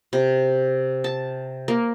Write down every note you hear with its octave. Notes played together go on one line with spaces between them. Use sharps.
C3
A5
A#3